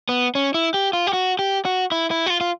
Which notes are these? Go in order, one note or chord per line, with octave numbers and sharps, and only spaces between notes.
B3
C#4
E4
G4
F4
G4
F#4
G4
F#4
E4
E4
F#4
F4
F4